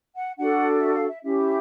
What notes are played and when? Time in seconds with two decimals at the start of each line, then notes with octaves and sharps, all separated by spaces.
0.16 F#5
0.37 D4 F#4 A4 F#5
0.79 E5
0.93 F5
1.08 E5
1.22 C#4 E4 G4 E5